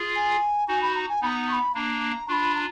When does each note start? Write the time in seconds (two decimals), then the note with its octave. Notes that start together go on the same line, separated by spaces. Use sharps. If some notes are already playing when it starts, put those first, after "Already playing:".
Already playing: F4 G#4
0.15 G#5
0.68 D#4 F#4 G#5
0.82 B5
0.95 A#5
1.09 G#5
1.21 B3 D#4 B5
1.26 A#5
1.49 C#6
1.52 B5
1.75 A#3 D4 A#5
2.28 D4 F4 B5 C#6
2.55 A#5